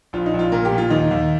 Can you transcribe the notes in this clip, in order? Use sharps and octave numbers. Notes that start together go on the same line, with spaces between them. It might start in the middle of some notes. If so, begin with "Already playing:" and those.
A#1 F4
D#4
A#1
F4
A#2 A#4
G4
A#2
F4
D#2 D#4
D#2